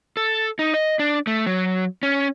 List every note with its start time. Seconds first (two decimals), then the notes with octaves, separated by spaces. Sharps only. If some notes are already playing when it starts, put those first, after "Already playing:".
0.17 A4
0.59 D#4
0.74 D#5
0.99 D4
1.27 A3
1.46 F#3
2.03 C#4